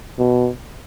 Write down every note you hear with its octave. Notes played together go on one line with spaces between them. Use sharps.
B2